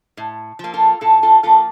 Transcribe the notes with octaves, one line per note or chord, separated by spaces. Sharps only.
A2
F3 A#3
F4 A4
A2 F4 A4
F4 A4
F3 A#3 F4 A4